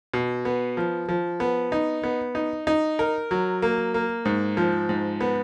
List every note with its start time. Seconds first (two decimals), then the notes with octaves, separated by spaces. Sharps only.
0.14 B2
0.45 B3
0.77 F3
1.09 F3
1.40 B3
1.72 D#4
2.03 B3
2.35 D#4
2.67 D#4
2.99 A#4
3.31 F#3
3.62 A#3
3.94 A#3
4.25 G#2
4.57 F3
4.89 G#2
5.21 B3